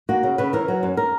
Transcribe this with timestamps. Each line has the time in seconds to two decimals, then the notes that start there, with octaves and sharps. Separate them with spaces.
0.09 A#3 F#4
0.23 C#3
0.38 C#3 B4
0.53 E3 A#4
0.68 F#3
0.83 F#2
0.97 A#4